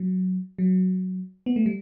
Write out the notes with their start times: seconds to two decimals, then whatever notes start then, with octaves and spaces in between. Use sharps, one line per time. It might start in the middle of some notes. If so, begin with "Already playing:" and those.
Already playing: F#3
0.58 F#3
1.46 B3
1.56 A3
1.66 G3